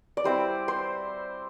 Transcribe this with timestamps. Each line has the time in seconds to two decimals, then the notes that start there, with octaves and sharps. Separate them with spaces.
0.17 D5
0.24 G3 C4 E4 C5
0.68 C5